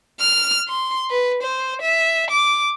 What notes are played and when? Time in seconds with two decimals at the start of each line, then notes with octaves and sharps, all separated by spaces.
0.20 F6
0.68 C6
1.10 B4
1.42 C5
1.81 E5
2.30 D6